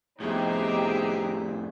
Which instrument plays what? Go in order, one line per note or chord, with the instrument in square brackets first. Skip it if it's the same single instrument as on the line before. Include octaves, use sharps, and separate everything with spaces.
[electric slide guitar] F2 A2 [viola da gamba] B3 [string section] D#4 G4 [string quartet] G#4 C5 E5